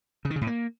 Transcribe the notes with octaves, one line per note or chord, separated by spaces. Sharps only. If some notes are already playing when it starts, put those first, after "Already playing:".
C#3
D#3
C#3
A2
A#3